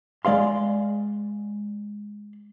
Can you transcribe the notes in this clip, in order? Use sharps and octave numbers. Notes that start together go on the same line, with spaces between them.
G#3 D5 F5 C6